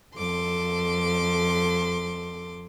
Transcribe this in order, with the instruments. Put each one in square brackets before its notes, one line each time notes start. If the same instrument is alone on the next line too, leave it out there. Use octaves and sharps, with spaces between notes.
[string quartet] F2 A4 C6 D6